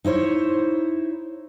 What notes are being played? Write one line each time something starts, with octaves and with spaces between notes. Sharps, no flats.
D#4 E4 C5 C#5